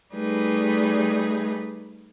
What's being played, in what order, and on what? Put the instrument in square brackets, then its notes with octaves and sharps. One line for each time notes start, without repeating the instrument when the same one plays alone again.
[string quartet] G3 A3 D#4 G#4 B4